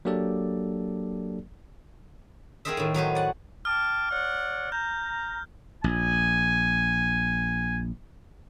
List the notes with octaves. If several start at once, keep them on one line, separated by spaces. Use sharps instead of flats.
F#3 A#3 D4 G4 A4 D5
C4 G#4 A#4 C5 D#5 E5
A2 D#3
F#3 D#4 B4 C5
D5 F#5
G5 A5 D6 F6
C#5 D5 F#5
A#5 G6
A#1 G#5